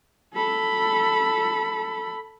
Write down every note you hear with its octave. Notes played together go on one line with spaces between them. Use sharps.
A4 B5